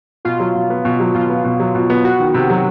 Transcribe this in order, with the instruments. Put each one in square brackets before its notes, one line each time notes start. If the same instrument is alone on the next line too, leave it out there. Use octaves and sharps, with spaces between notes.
[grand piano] B2 [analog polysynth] F4
[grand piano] F#3
B2
B3
B2
F#3
[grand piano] B2 [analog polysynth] F4
[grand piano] B3
B2
F#3
B2
B3
[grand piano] B3 [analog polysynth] F#4
[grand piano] D#3
C3
F#3